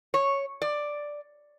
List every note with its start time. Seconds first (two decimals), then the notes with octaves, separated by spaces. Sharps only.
0.14 C#5
0.62 D5